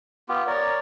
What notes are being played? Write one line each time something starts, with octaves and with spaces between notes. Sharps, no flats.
B3 F4 G4
A#4 C#5 D5